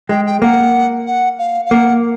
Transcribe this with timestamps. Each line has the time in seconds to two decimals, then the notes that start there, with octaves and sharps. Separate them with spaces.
0.09 G#3 G5
0.26 G5
0.42 A#3 F#5
1.07 F#5
1.39 F5
1.66 F5
1.70 A#3 F#5